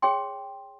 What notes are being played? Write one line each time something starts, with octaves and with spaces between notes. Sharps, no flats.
G#4 C#5 G5 C6